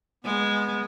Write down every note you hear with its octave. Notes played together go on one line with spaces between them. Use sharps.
G#3 B3